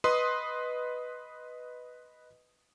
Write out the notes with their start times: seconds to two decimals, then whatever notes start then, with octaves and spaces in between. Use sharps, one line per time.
0.04 B4 D#5 C6 D#6